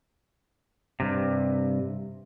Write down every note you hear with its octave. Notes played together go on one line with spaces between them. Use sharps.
G2 C3